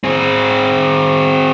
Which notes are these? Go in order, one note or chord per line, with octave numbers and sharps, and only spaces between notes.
C4 G#4